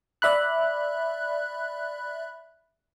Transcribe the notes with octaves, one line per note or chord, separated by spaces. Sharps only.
D5 E5 B5 F#6